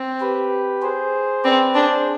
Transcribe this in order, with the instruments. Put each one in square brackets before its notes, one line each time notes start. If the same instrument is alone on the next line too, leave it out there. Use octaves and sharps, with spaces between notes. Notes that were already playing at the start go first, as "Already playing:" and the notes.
Already playing: [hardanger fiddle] C4
[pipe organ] G4 B4
G#4 C5
[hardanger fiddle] C4 [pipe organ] B4 D5
[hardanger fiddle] D4 [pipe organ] G#4 C5